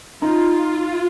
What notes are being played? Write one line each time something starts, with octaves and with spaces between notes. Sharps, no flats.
D#4 F4